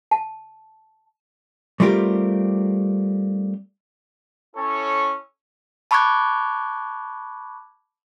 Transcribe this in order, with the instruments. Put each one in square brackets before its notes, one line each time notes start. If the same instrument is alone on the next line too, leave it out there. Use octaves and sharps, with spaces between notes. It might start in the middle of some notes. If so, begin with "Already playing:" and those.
[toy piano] A5
[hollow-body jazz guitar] G3 A3 C4 F4 G4 A#4
[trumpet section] C#4 E4 A4 C#5
[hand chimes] A5 B5 C#6 D6 F#6 G#6